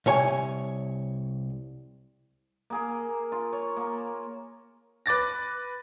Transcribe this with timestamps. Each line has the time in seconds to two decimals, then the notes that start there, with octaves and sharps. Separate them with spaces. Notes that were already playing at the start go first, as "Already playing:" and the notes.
0.06 C2 C#5 G#5
2.70 A#3 G#4 A#4
3.32 F4
3.52 C#5
3.77 A#3
5.06 B4 D6 A6 A#6